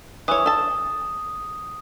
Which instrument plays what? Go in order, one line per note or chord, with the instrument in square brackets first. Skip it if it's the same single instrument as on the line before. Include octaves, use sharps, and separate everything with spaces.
[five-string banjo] E3 C#5 [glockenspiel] D#6
[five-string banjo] A4 A5